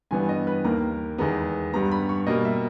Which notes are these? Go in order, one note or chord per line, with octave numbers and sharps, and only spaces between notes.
G2 E3 G3 B3 G#5
D#5
B4
D#2 D#3 A#3 A#5
E2 D#3 G#3 B3 A#5
G2 G3 B3 A#5
B5
C#6
B2 G3 A#3 D#5
E5